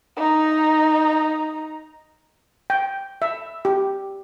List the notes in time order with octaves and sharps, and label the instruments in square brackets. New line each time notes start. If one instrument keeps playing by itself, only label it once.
[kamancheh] D#4 A#5
[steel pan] G5
E5
G4